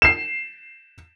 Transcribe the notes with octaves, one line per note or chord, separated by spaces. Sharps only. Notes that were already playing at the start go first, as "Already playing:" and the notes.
C7 E7